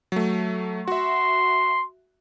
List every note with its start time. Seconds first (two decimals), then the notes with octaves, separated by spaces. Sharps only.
0.12 F#3 A3
0.88 F#4 E5 C6